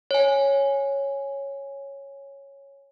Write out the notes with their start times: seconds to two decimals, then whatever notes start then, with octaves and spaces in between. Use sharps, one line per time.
0.11 C#5 G#5